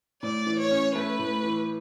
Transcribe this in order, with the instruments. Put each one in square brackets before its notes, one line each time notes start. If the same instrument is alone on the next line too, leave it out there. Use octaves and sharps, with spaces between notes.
[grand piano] A2 [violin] D5
[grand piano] E3
[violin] C#5
[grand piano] C#4
[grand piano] A3 [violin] B4
[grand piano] A2
E3